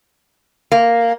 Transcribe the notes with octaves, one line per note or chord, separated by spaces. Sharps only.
A#3